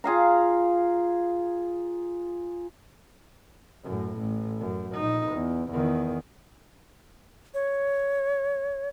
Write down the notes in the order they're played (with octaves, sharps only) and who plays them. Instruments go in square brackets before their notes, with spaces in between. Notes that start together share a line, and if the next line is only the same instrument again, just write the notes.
[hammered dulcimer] F4 G#4 F5 A#5
[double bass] F#2 A2
A1
F#2
A#1 D#4
E2
E2 D#3
[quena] C#5